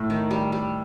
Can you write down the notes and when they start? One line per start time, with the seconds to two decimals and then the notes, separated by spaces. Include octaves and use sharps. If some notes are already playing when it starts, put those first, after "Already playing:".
Already playing: A2
0.10 D#3
0.31 G3
0.52 G3